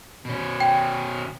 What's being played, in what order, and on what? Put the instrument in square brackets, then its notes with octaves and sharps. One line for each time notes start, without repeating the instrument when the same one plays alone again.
[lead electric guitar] B2 C#4
[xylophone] G5